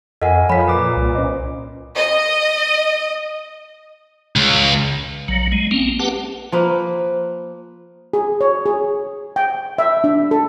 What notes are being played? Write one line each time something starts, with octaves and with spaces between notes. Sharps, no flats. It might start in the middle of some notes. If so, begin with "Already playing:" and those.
F2 A4 A#4 D#5 F#5 G#5 B6
F3 C#5 F5 B5 B6
A#2 B4 A#5 D6 D#6
C2
C#4 C5 D#5
D#5
C#2
A#1 F#3
G#3
A#3 C4 C#4
G4 B4 F#5 A5
F3 A#3 B4
G#4
C#5
G#4
G5
E5
D4
A4